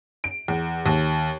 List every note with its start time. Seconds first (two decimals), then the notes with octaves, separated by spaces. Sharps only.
0.24 D7
0.48 E2
0.86 D#2